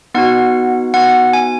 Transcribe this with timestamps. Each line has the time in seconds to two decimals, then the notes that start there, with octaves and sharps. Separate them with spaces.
0.14 B3 D#4 F#4 F#5
0.94 B3 D#4 F#4 F#5
1.33 G#5